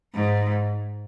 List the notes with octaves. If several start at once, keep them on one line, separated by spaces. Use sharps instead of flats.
G#2